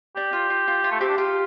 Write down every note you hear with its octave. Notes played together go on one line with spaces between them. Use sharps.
D4 G4
F4
F4
F4
F4
A3
C4 G4
D4
F4 G4